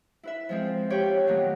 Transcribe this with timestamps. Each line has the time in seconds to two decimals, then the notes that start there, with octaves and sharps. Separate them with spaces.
0.23 E4 B4 E5
0.49 F3 G#3 C4
0.90 F4 G4 C#5 G5 B5
1.27 A#2 D#3 F#3 A3 B3